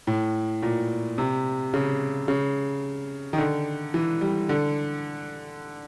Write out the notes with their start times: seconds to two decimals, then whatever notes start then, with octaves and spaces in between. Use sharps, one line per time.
0.07 A2
0.63 A#2
1.18 C3
1.74 C#3
2.28 C#3
3.33 D#3
3.38 D3
3.94 E3
4.21 G3
4.49 D3